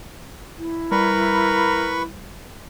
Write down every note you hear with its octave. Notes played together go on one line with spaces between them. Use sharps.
E4
G3 A#4 B4 B5 C#6